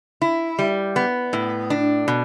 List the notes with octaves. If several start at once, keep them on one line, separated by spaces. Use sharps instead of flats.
E4
G3
B3
A2
D4
B2